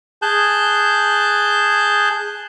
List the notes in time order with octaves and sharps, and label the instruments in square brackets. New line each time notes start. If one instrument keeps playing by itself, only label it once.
[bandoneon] G#4 A5 F#6 G6